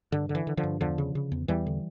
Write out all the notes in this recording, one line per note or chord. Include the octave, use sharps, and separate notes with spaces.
G2 D3
D3
E3
D3
D3 F3
G2
E2 D3 F3
C#3
C#3
E2
E2 E3 G3
D3